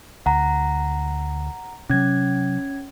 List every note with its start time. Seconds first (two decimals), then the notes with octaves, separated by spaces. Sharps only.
0.26 D2 F#5 A#5
1.89 C3 F#3 C#4 G#6